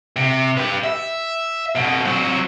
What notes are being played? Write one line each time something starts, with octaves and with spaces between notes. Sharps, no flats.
C3
G4 B4
E5
F2 B2
F#3 C4